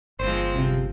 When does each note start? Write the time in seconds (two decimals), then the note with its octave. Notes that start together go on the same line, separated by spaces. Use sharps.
0.19 G1 F3 G#3 C4 C5
0.54 C2 C3